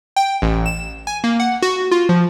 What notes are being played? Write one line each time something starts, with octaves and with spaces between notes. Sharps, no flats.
G5
A1
E7
G#5
A#3
F#5
F#4
F4
F3